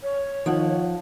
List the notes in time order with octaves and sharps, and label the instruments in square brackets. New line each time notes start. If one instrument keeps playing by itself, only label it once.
[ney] C#5
[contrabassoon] D#3 [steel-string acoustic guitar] F3 F#5